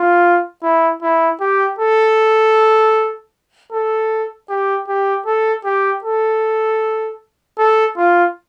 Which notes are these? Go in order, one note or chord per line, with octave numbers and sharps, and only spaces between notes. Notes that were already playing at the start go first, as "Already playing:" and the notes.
Already playing: F4
E4
E4
G4
A4
A4
G4
G4
A4
G4
A4
A4
F4